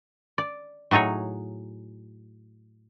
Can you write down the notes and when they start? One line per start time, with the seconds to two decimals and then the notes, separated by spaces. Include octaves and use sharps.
0.38 D5
0.91 A2 F#3 D#4 G#4 C#5